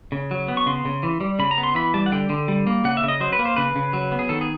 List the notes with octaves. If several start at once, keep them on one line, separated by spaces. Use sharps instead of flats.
C#3
F#3
B3
C#6
C#3 C6
C#3
E3
G3
C#3 B5
A#5
B3
C6
E3 B5
G3 A5
F#5
D3 G5
D3
G3
A#3
C#3 F#5
E5
C#3
D#5
F#3 C5
B4
A#3
C5
C#3 B4
C#3
F#3
B3
G#4
D#3 A4
G#4